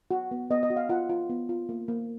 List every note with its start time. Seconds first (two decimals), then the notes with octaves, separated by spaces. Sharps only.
0.11 F#4
0.31 B3
0.51 B3 D#5
0.63 D#5
0.70 F#4
0.76 F5
0.89 F4 F#5
1.09 F4
1.30 B3
1.49 F4
1.69 A#3
1.88 A#3